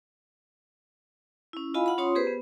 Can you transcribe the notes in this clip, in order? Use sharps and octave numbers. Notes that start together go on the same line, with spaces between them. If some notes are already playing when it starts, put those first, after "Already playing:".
C#4 E4
E4 F4 D#5 F5 G#5 B5
F4 F#5 B5
C#4 F4 C#5 C6 D#6
B3 G4 G#4 B4 C5
B3